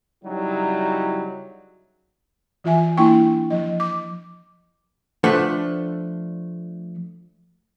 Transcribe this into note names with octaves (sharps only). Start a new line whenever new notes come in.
C#3 F#3 G3 D#4 E4 F#4
E3 F4 E5 G#5
A#3 D4 E4 G5 C6 C#6
F3 D#5
D6
F3 A3 D4 B4 C5 F#5